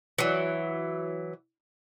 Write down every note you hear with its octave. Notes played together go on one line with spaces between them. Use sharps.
E3 F#3